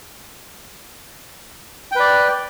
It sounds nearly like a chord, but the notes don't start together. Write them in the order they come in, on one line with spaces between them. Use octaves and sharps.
G5 B4 D5